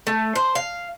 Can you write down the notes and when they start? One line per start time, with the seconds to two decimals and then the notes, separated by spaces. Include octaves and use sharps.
0.07 A3
0.36 C5
0.55 F5